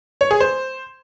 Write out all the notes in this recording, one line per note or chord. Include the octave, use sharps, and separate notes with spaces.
C#5
G#4
C5